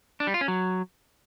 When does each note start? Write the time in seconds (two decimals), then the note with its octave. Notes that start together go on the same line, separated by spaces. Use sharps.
0.20 D4
0.27 G3
0.34 F4
0.41 C#4
0.48 F#3